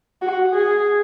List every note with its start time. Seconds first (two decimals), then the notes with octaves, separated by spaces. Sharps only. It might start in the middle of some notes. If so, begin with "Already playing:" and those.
0.22 F#4
0.53 G#4